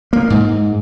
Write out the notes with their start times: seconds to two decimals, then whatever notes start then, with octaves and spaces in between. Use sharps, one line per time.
0.13 A#3
0.30 G#2